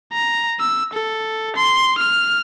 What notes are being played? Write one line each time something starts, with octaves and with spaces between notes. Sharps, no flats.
A#5
E6
A4
C6
F6